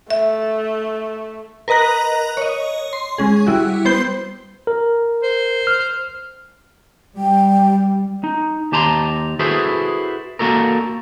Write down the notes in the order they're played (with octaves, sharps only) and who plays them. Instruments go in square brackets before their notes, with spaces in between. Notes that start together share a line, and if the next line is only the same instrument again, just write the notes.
[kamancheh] A3 [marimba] E5
[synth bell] A#4 B4 D#5 A#5 F#6
C#5 D#5
C6
G#3 C#4 G#4
G3 E4 F#4
B3 C5 G6
[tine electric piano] A#4
[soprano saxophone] C5
[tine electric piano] F6
[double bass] G3 [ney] G5
[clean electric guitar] D#4
D#2 G4 A5 A#5 C6
E4 F#4 G#4 A4 B4 C5
A#3 F#4 A4 A#4